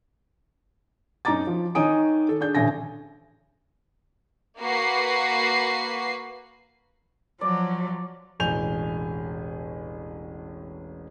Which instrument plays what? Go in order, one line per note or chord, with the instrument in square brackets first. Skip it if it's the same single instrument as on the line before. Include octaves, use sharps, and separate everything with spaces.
[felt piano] F#2 D#4 D#5 A#5 D6 A6
F3
D#3 D#4 C#5 G#5 D#6 D7
A4
D4 G#4 G6
D#1 A1 D3 G#5 A#6
[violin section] A#3 F#4 B4 C7
[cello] F3 F#3 [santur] D5
[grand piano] E1 A1 G#5 G6 F7